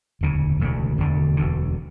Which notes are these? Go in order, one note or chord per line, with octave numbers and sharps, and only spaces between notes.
E1 D2 C#3
E1 D2 C#3
E1 D2 D3
E1 D2 D3